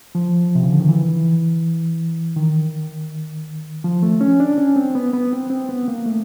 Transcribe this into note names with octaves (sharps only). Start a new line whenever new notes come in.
F3
C3
C#3
D3
D#3
E3
D#3
F3
A3
C#4
D4
C#4
C4
B3
B3
C4
C4
B3
A#3
A3